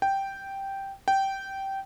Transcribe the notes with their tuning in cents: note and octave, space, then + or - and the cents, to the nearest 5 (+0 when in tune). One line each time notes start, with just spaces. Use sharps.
G5 -5
G5 -15